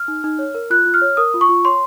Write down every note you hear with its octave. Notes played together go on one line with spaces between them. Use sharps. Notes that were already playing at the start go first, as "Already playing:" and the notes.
Already playing: F6
D#4
D#4
C#5
A#4
F4 F#6
F4
F6
C#5
A#4 D#6
F4
C#6
F4
C#5 C6